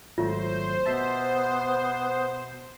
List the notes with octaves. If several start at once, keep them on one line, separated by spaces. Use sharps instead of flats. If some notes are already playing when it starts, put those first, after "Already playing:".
G#1 F#3 A3 F4 C5
B2 B3 E5 A5